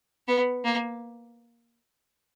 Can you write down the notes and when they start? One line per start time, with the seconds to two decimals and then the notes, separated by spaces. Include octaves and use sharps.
0.28 B3
0.65 A#3